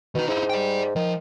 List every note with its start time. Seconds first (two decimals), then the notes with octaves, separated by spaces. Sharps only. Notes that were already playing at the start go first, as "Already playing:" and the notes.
0.15 B2 D#3 D#4
0.28 G#2 D#4 E4
0.50 D5 G5
0.96 D#3 F3